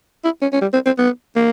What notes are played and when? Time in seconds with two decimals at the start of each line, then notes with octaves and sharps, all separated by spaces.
0.24 E4
0.42 C#4
0.52 C#4
0.61 G3
0.73 C4
0.86 C4
0.98 B3
1.36 A#3